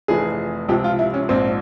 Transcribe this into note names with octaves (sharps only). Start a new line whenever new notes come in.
F1 F2 E3 G#4
C#2 C3 F3 G4
F4
E4
C#4
A#1 G#2 F3 C4